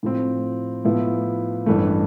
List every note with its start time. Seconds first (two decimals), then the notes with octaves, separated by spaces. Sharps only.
0.03 A2 F3 C4
0.85 A2 F3 B3 E4
1.66 A1 G2 E3 A3